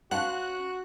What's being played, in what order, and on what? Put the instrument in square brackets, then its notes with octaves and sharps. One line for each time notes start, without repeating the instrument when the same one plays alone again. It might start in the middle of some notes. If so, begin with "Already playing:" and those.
[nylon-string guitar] C#4 F5 [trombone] F#4 [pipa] F#5 A5 C6 [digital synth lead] F#6